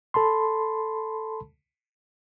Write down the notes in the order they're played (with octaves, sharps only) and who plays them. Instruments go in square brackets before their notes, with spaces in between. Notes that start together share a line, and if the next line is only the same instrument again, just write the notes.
[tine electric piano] A4 A5 B5 C6